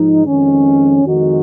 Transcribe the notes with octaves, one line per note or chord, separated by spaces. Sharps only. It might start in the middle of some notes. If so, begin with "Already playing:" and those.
Already playing: G#2 F3 D#4
F2 D#3 G#3 C#4
F2 D#3 G#3 D#4 F#4